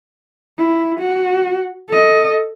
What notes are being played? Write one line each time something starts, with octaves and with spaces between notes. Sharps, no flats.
E4
F#4
A4 D#5